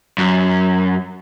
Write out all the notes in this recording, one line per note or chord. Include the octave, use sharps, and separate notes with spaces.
F#2